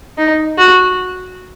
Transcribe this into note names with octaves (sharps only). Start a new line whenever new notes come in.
D#4
F#4